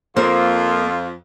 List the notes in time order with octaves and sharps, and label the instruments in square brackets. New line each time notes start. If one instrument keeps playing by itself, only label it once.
[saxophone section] F2 [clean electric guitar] A#3 [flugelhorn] F4 [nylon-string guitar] C5